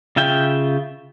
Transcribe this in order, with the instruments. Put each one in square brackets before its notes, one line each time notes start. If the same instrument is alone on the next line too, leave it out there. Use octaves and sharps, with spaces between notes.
[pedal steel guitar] C#3 F4 E5 G5